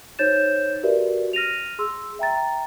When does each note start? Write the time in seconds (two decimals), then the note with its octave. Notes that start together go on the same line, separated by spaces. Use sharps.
0.19 D#4 C5 C#5 G6 A6 E7
0.83 F#4 G4 A#4 B4 D5 E5
1.33 F6 A#6 D#7 F7
1.79 G#4 C6 E6
2.19 E5 G5 A#5 A6